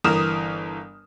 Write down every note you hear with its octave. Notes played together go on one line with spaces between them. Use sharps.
G1 E3 A#4 D#6 F6 E7